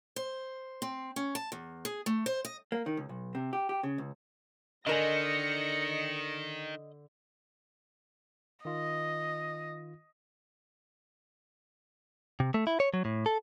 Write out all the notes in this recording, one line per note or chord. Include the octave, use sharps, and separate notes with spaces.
C5
C4
C#4
A5
E2
G#4
A3
C5
D#5
A#3
D#3
C#2
B1
C3
G4
G4
C#3
C#2
D3 D#3 A#4 D#5 G#5 A#6 C#7
D#3 F4 D#5
C3
A3
E4
C#5
F#3
A2
A4